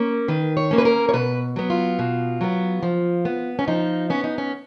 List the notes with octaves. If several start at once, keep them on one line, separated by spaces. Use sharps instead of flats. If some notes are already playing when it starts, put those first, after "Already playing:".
Already playing: A#3 C#4
D#3 B4
C#5
A#3 C#4
B4
A#4
C#5
B2 B4
F#3 B3
F4
B2
F#3 B3
F3
B3
C#4
F3 D#4
B3 C#4
D#4
C#4